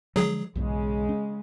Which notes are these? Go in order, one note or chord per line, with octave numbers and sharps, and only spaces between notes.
D3 F3 F#3 G#3 G#4
B1 E2 G#2 C#3 G#3
C#4